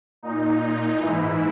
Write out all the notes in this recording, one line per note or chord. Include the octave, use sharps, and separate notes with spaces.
A#2 D#4
A#2
G#2 E3 E4